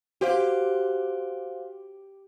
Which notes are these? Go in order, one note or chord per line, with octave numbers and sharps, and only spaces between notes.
F#4 G4 C5 F5